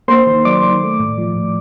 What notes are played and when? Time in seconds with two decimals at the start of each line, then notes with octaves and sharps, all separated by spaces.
0.08 A#3 C5 C6
0.27 D#3
0.45 F#3 D5 D6
0.63 D#3
0.82 A3
1.00 A2
1.18 F3
1.36 A2